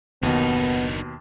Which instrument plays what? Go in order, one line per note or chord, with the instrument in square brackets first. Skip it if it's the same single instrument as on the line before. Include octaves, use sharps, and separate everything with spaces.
[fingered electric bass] F#1 D#3 [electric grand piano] D#2 B2 [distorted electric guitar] D3 D#4 [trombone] B3